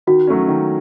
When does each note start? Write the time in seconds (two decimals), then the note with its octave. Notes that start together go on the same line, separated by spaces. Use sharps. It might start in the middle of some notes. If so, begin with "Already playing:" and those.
0.07 D#3 F#4
0.27 F#3 A3 C#4
0.48 D#3